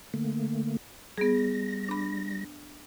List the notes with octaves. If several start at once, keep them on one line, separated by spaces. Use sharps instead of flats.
D3 A3 A#3
G3 B3 G#4 A#6
D4 B5